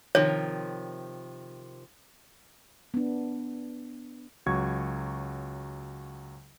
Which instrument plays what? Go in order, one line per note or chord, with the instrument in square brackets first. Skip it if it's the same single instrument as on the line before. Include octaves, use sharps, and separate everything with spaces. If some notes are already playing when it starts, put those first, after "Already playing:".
[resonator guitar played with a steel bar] C3 D#3 F3 [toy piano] C#5
[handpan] B3 D4
[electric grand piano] C#2 F#3 F#4 C#6 G#6